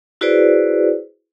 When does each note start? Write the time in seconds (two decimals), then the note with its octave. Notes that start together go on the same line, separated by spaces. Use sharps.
0.21 E4 F#4 G#4 B4 C5 D5